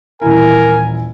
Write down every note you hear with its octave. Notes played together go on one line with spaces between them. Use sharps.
D#1 E3 E4 A#4 G#5